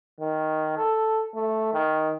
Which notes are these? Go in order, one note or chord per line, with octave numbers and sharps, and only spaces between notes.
D#3
A4
A3
D#3